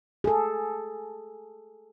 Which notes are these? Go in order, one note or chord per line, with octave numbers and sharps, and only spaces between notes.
G#4 A4